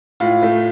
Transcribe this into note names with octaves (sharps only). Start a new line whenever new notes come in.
A2 F4
A3